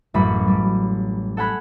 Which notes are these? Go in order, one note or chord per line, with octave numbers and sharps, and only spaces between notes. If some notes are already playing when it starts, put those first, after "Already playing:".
A1 F#2 G3 B5
G3
A4 F#5 G#5 B5 F#6